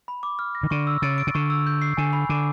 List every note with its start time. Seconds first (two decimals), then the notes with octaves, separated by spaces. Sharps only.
0.08 B5
0.23 D6
0.39 F6
0.55 A#6
0.63 D#3
0.70 D3 C#6
0.87 E6
1.02 C#3 A6
1.18 D7
1.27 C#3
1.34 D3 C#6
1.50 E6
1.67 G6
1.82 C7
1.97 D3 G#5
2.13 B5
2.29 D3 D6